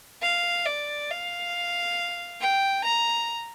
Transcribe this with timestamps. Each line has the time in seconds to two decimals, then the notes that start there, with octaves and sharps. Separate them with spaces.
0.22 F5
0.66 D5
1.10 F5
2.41 G5
2.85 A#5